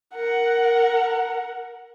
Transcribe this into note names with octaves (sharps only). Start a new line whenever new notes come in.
A#4 F#5